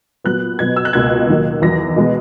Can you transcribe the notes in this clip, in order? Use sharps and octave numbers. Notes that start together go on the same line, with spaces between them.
A#2 F#3 B3 F#6
B2 F#3 B3 G#6
E6
F#6
C#2 B2 A#3 G#6
D#2 D#3 F#3 A#3
E2 D#3 F#3 A#6
B2 G#3 B3